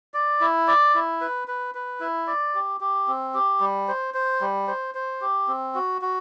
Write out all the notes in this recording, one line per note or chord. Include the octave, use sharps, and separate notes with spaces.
D5
E4
D5
E4
B4
B4
B4
E4
D5
G4
G4
C4
G4
G3
C5
C5
G3
C5
C5
G4
C4
F#4
F#4